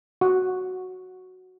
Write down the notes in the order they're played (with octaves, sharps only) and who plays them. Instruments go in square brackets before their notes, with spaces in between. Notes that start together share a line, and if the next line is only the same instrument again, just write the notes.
[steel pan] F#4